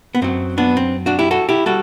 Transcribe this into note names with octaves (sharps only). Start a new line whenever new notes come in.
B3
F#2 F#3 C4
B3 D4
C4
D4 F#4
E4 G4
F#4 A4
E4 G4
G3 F#4 A4